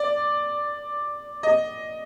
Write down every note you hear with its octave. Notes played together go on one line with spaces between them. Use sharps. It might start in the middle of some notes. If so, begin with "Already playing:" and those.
Already playing: D5
D#5